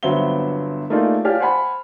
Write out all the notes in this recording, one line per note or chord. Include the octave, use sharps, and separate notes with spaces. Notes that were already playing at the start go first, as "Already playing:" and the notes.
G1 F#3 B3 C4 E5 G7
A3 A#3 D#4 F4 G#4 D5
G4 C#5 D5 F5 G#5 F6
C5 F#5 G#5 B5